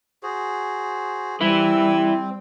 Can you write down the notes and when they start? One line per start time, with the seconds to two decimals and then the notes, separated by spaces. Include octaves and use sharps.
0.23 F#4 G#4 C5
1.41 G3 C4 E4 B4 E6